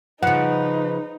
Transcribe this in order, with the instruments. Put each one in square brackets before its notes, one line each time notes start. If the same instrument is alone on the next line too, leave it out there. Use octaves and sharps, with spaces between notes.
[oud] C#3 F3 [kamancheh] D#4 [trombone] B4 [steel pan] F#5